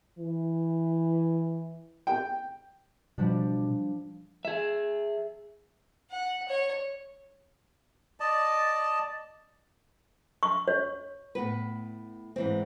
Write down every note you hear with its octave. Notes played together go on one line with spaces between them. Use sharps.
E3
G5
B2 F3 G3 D4
G#4 E5
F#5
C#5
D5 D#5 A5
C#6
C#5
A2 B3 B4
G#2 E3 C4